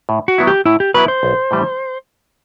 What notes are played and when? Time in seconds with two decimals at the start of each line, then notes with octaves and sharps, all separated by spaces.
0.09 A2
0.28 F#4
0.38 F#3 B3 E4
0.47 G4
0.66 A2 E4
0.80 G4
0.94 F#3 B3 E4 B4
1.08 C5
1.23 B1
1.51 A2 E3 G3